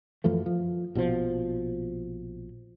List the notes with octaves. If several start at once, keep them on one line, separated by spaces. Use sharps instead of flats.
F#2 E3 F3 A3
F3
A#1 B2 D3 F3